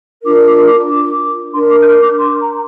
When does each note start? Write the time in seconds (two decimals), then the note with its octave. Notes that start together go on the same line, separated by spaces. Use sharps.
0.24 D4 F4 A#4 D6
0.45 D6
0.66 D6
0.88 D6
1.53 D4 C6
1.56 A#4
1.69 D6
1.80 G6
1.85 F6
2.01 D6
2.18 C6
2.40 A#5